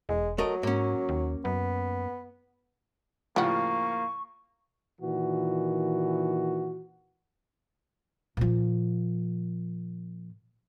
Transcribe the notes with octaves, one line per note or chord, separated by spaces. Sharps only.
E1 G#3
F#3 A3 A#4 D#5
G#2 A#3 C#4
D#2
F#2 B3
A2 C#3 F3 G3 A#3 F#4 C#6
A#2 D#3 E3 F#4
A#2 F3